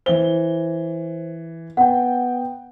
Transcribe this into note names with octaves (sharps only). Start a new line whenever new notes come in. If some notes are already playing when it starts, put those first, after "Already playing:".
E3 C5 G7
B3 F#5 G5